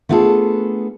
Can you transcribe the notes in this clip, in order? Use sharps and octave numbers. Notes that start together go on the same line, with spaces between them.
A3 B3 D4 F4 G#4 A4